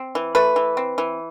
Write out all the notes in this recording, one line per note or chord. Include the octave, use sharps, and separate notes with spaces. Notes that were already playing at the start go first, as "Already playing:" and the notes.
Already playing: C4
E3
A3 B4
E3
C4
E3